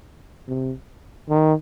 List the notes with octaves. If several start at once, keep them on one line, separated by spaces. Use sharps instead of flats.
C3
D#3